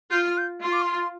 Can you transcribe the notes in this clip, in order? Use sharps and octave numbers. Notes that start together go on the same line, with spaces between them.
F4 G6
F6
G6
F4 C6
D6
C6